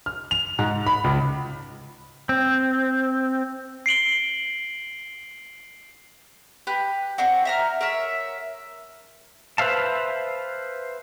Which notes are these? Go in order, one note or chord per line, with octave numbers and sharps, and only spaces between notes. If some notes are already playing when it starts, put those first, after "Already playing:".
F6
F7
G#2
B5
C#2
C4
C7 D7 F#7 G7
G4 B4 F#6
C4 D4 F#4
E5 A#5 F6
A#4 C#5 E5
B4 C5 E5 F5 A5